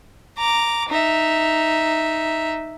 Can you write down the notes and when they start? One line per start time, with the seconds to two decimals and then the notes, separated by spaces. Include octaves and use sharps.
0.38 A#5 D6
0.89 D#4 E5